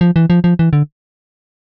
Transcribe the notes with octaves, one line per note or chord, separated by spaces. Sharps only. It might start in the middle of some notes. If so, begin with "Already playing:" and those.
F3
E3
F3
F3
E3
D3